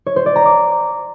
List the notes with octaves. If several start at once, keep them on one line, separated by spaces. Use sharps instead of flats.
C#5
C5
D5
A#5
D6